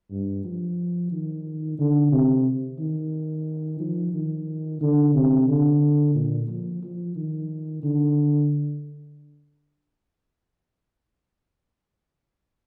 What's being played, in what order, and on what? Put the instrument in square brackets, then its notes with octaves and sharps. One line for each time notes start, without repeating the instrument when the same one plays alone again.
[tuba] G2
F3
D#3
D3
C3
D#3
F3
D#3
D3
C3
D3
A#2
F3
F3
D#3
D3